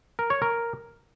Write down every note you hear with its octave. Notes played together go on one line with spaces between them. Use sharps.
A#4
C#5
A#4